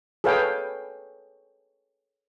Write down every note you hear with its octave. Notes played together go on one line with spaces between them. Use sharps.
G#4 A4 B4 C#5 F5 G5